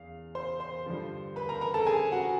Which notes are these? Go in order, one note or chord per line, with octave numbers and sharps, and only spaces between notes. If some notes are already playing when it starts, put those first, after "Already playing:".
Already playing: E2 F5
C5 C6
C5 C6
G2 D3 F3
B4 B5
A#4 A#5
A#4 A#5
A4 A5
G#4 G#5
F#4 F#5